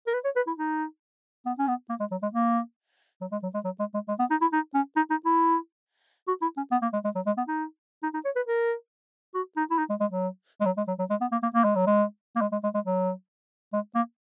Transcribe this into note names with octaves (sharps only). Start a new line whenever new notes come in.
A#4
B4
C#5
B4
E4
D#4
B3
C#4
B3
A#3
G#3
F#3
G#3
A#3
F#3
G#3
F#3
G#3
F#3
G#3
G#3
G#3
B3
D#4
E4
D#4
C#4
D#4
D#4
E4
F#4
E4
C#4
B3
A#3
G#3
G#3
F#3
G#3
B3
D#4
D#4
D#4
C#5
B4
A#4
F#4
D#4
E4
D#4
G#3
G#3
F#3
G#3
F#3
G#3
F#3
F#3
G#3
B3
A#3
A#3
A#3
G#3
F#3
G#3
A#3
G#3
G#3
G#3
G#3
F#3
G#3
A#3